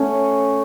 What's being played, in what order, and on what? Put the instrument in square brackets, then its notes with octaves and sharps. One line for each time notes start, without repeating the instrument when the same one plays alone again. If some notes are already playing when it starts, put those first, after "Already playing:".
Already playing: [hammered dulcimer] A3 C#4